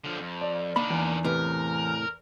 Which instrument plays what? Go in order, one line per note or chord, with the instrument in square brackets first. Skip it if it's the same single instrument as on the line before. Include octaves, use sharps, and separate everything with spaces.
[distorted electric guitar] D3 F3
F2
[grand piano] D5
[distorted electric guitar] D#3 D4 [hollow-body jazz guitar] A#3 B5
[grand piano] E2
[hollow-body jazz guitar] A2 C3 B4 [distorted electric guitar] A#4